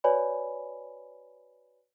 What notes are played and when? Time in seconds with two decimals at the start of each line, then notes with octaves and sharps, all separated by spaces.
0.04 F#4 B4 C#5 D5 G#5 B5